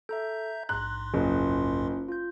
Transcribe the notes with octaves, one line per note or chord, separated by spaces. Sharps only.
A4 E5 A#5 G6
A#1 G#2 A#5 C6 F#6
F#1 C#4 F4
F4 G6